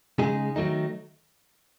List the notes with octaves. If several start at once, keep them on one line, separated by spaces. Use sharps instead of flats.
C#3 G#3 D#4 G#4
D#3 F#3 A3 D#4